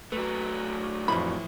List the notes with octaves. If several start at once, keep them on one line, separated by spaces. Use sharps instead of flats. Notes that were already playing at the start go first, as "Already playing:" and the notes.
F#3 A3 B4
F2 A2 E3 F3 B5